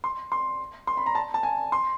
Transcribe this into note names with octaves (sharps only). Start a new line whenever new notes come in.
C6
C6
C6
B5
A#5
A5
A5
G#5
C6